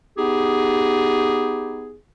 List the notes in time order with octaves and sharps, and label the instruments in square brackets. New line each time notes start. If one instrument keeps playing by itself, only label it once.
[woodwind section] B3 D#4 G4 G#4